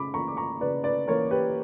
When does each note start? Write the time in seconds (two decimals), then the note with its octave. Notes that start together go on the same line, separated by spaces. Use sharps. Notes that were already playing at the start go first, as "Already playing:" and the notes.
Already playing: C#3 B5 D6
0.14 E3 A#3 A#5 C#6
0.28 D6
0.37 A#5 C#6
0.61 C#3 B4 D5
0.84 B4 D5
1.07 E3 A#3 A#4 C#5
1.31 G4 B4